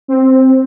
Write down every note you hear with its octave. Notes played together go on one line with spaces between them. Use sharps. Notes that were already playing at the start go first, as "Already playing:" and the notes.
C4